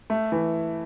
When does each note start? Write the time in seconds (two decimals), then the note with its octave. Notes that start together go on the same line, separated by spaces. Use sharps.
0.10 A3
0.32 E3